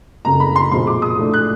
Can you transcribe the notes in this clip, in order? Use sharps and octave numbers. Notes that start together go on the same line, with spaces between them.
F#1 F2 C#3 A#5
B5
C6
B1 A#2 F3 G#3 C4 C6
D6
D#6
A2 F3 A3 D4
F#6